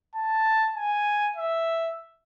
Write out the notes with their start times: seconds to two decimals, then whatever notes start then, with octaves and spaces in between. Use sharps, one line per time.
0.15 A5
0.76 G#5
1.36 E5